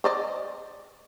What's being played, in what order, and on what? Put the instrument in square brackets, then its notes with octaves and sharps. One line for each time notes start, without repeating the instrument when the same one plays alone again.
[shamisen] C5 D5 D#5